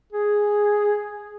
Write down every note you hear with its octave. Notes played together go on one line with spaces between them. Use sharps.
G#4